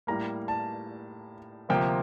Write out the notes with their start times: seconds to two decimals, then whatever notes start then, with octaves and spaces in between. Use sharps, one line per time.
0.07 A2 G3 A#3 A#5
0.48 A5
1.69 D2 C3 F3 A#3 G5